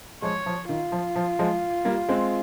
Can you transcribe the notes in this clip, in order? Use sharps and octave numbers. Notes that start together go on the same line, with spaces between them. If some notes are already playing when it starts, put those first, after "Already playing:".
F3 G#3 C#5
F3
D#3 F4
F3
F3
F3 G#3
G3 A#3
G#3 C4